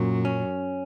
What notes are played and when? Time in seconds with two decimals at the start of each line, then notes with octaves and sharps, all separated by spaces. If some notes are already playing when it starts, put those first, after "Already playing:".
Already playing: F#2 A#2 F#3
0.25 C#4